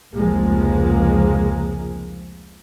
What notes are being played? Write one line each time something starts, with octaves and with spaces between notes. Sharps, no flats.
F1 C#2 F3 G#3 A#3